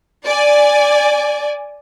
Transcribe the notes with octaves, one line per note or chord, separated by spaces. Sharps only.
D5 G#5